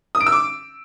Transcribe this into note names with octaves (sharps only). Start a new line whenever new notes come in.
D#6
D7
E6
D6